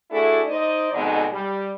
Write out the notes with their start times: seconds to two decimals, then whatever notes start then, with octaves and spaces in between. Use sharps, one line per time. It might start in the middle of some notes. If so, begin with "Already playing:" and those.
0.11 A3 D4 E4 F#4 G#4 A4
0.48 D#4 C5 D5 D#5
0.93 F2 B2 D3 G#3 C4 D#4
1.32 G3